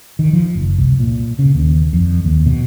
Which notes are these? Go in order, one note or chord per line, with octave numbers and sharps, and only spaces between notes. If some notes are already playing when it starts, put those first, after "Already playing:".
D#3
F3
F#1
C2
A#2
C#3
D#2
F2
D#2
B2